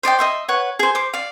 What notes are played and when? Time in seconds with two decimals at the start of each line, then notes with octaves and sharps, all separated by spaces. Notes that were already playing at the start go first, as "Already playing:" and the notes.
0.03 C5 D5 D#5 G5
0.19 D#5 E5 C6
0.48 B4 C#5 F#5
0.79 G#4 C5
0.95 C5 D6
1.14 D5 F5